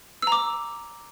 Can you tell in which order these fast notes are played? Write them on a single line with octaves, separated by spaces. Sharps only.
E6 A#5 D6